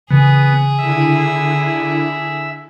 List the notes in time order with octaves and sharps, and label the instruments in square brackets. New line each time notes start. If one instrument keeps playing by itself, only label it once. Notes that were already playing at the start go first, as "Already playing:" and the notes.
[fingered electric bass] C#3 E3 [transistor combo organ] B3 [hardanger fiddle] G#4
[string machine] D3 E4 [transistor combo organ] E5